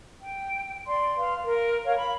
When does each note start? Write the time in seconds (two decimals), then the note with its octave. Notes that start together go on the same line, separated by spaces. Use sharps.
0.22 G5
0.86 D5 C6
1.16 B4 F5 C6
1.44 A#4
1.85 A#4 C#5 F5
1.97 B5